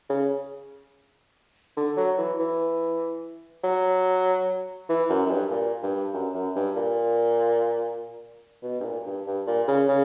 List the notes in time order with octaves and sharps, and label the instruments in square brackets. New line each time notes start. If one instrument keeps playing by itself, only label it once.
[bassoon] C#3
D3
F#3
E3
E3
F#3
E3
F#2
F#2
G2
A#2
G2
F#2
F#2
G2
A#2
B2
G2
A#2
G2
G2
A#2
C#3
C#3